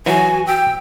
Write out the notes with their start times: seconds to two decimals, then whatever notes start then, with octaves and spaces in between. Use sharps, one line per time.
0.06 E3 F#3 F#4 G#5
0.47 G5 E6